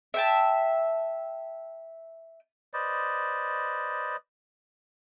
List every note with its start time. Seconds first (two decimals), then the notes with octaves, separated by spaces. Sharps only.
0.14 E5 G5 A5
2.73 B4 C5 D5 D#5